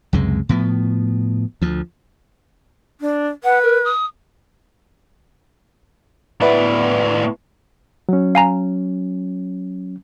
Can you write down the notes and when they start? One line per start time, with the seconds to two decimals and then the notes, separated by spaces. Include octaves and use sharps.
0.13 C#2 F#2 C3 G#3
0.49 A2 F3 B3
1.62 D2 F3
3.01 D4
3.44 B4 F#5
3.63 A#4
3.84 D#6
6.42 A2 B3 E4 B4 D5
8.09 F#3 C#4
8.35 F5 G#5 A#5